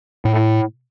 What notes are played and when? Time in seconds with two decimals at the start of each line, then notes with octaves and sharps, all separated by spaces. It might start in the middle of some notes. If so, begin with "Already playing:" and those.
0.25 A2